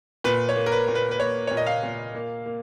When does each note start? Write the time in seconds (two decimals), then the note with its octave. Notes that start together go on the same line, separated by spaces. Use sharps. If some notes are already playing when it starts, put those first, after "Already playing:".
0.24 A#2 B4
0.49 C#5
0.56 A#3
0.66 A#4
0.72 B4
0.88 A#2
0.95 B4
1.11 B4
1.20 A#3 C#5
1.47 A#2 C#5
1.57 D#5
1.66 F5
1.83 A#2
2.15 A#3
2.46 A#3